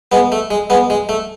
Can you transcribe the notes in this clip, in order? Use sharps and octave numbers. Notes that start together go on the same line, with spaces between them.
G#3 B3
A3
G#3
G#3 B3
G#3
A3